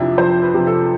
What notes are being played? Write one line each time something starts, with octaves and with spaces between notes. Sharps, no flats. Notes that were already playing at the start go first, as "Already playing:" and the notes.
Already playing: F2 C3 F3 D4 E4
F2 C5
B4
C3 F3
A4